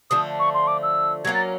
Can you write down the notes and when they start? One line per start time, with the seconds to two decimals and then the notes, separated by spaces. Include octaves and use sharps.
0.10 D3 F3 A3 D#6
0.39 C#6
0.54 C6
0.67 D6
0.83 E6
1.25 F#3 G#6
1.27 A#3 C#4
1.34 A6